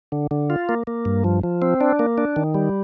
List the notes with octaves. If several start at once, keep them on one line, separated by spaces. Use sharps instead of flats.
D3
D3
F4
A#3
A#3
G2
F3
F3
C4
D4
A#3
D4
D#3
G3